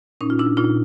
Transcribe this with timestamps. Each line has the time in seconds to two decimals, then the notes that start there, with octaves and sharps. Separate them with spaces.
0.21 A#2 C#4 D#4
0.30 F4
0.39 D4 E4
0.57 A#2 D#4 F4